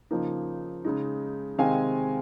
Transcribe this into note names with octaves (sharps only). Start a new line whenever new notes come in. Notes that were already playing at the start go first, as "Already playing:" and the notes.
C#3 F3 A#3 D#4
C#3 G#3 D#4
C3 D#3 G#3 C4 F5 G#5